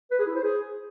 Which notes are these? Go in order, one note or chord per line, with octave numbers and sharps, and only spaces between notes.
B4
G#4
E4
C5
G#4